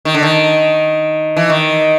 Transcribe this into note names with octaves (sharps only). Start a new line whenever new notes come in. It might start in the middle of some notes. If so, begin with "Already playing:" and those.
D#3
D3
D#3
E3
D#3